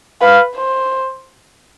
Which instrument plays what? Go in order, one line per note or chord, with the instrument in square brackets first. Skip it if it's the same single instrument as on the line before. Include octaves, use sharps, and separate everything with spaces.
[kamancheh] B4 [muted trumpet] F5
[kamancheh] C5